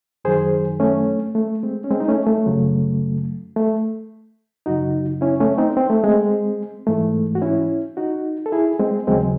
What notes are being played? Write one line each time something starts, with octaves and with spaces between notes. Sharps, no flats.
F#2 D#3 F#3 G#4 C5
A3 C#4
A3
G#3 C4
C#4
G#3 C4
D#4
A3 C#4
A3
F#2 C#3 F#3
A3
F#2 C#3 F#3 D#4 F#4
C#4 E4
A3 C#4
C4 D#4
C4
A3
G#3 C4
G#2 E3 G#3 A3
F#4
C#4 E4
D#4 F#4
A4
E4 G#4
G#3 C4
D#2 C#3 F#3 G#3 C4